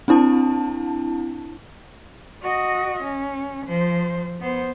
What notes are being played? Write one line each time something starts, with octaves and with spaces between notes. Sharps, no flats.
C4 D4 E4 A5
F#4 D#5
C#4
F3 C5
B3 C5